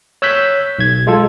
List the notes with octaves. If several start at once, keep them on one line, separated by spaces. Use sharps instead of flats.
C#5 E6 F#6 G6 B6
B1 G#6
G#3 F4 A4